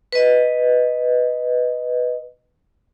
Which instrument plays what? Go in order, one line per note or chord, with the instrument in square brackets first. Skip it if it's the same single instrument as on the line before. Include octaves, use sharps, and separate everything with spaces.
[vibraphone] B4 D#5